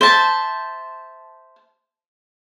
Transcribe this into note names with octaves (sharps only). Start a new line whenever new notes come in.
C5 E5 A5